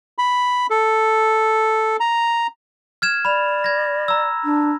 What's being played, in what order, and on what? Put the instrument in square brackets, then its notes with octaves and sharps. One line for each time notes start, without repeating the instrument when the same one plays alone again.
[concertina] B5
A4
A#5
[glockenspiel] F6 G#6 E7
[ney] D5 [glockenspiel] B5 F7
[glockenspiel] G#6 A#6
A#5 E6
[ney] D4